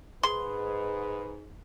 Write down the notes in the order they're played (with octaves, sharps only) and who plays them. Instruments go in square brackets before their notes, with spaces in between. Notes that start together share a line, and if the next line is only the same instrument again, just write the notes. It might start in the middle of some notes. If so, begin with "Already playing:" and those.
[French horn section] G#2 [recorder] G#4 [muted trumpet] B4 [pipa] C6